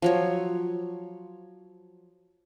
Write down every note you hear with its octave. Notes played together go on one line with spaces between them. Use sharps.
F3 F#3 C#5